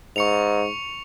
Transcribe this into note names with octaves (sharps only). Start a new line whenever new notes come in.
G#2 C#6 C#7 F7